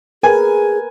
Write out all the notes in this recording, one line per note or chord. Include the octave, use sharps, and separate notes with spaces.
G#4 A#4 B4 G#5